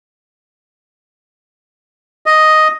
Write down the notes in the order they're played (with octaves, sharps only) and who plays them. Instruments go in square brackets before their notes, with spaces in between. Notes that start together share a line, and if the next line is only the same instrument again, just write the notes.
[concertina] D#5